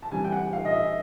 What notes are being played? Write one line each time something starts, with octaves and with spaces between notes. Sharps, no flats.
A5
C3 E3 G3 G#5
G5
F#5
F5
D#5
E5